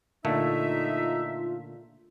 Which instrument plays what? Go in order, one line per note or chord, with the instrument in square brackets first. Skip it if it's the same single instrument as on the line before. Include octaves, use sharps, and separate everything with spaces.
[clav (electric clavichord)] A#2 D3 A3 [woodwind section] D#4 E5 [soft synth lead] F4